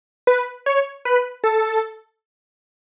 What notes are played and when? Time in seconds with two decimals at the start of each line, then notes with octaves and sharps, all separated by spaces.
0.27 B4
0.66 C#5
1.05 B4
1.44 A4